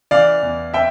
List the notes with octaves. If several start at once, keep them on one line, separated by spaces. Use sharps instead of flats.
E3 D5 F5
E2
C4 E5 G5